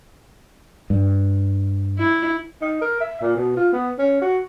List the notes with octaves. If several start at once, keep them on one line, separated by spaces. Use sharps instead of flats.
G2
E4
D#4
A#4
E5
A#2
B2
F4
B3
C#4
F#4